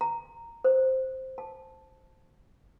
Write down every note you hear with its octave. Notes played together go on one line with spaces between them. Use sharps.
A#5
C5
A5